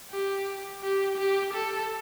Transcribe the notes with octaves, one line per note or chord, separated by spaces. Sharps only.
G4
G4
G4
A4